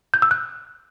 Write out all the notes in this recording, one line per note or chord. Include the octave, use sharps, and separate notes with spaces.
G6
E6
F#6